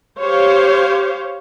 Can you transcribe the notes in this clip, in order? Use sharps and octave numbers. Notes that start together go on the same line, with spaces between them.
G4 C5 C#5 F5